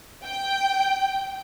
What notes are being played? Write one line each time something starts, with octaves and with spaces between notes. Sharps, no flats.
G5